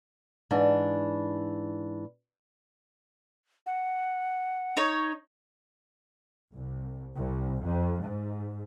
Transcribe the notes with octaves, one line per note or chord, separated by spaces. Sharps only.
G#2 E3 D4
F#5
D#4 C#5
C2
C2
F2
G#2